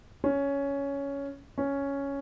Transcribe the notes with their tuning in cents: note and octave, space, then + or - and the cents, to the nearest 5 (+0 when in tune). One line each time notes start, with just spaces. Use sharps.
C#4 +10
C#4 +5